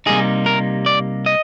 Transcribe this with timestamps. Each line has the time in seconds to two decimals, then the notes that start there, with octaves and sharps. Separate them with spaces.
0.06 C3 G3 A#3 D#4 G#4
0.46 A#4
0.86 D5
1.26 D#5